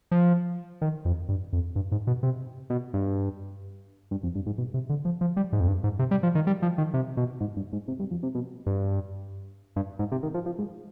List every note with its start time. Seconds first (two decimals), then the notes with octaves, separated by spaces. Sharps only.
0.11 F3
0.81 D#3
1.05 F2
1.29 G2
1.53 F2
1.76 G2
1.92 G#2
2.07 B2
2.23 C3
2.70 B2
2.94 G2
4.11 G2
4.23 F2
4.35 G2
4.46 G#2
4.58 B2
4.74 C3
4.89 D3
5.05 F3
5.21 F3
5.37 G3
5.53 G#2
5.60 F2
5.68 G2
5.84 G#2
5.99 C3
6.11 G3
6.23 F3
6.35 D#3
6.47 G3
6.62 F3
6.78 D#3
6.94 C3
7.17 B2
7.41 G#2
7.57 G2
7.73 G#2
7.88 C3
7.99 G2
8.11 F2
8.23 C3
8.35 B2
8.66 G2
9.76 G2
9.99 G#2
10.12 C3
10.23 D#3
10.34 F3
10.46 F3
10.58 G#2